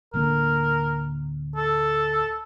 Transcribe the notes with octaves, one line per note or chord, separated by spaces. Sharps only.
D1 D3 A#3 A#4
A4